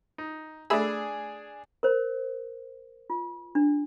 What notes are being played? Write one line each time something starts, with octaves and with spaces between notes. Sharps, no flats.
D#4
A3 D4 G#4 B5 E6
A#4 C5
F4
D4